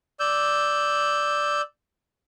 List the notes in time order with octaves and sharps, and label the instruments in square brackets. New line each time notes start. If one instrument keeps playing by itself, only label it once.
[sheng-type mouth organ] D5 E6 G6